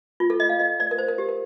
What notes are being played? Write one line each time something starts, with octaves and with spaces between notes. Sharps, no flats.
F4
A4
D#5
F5
D#5
D5
A#4
C5
A#4
G4
A#4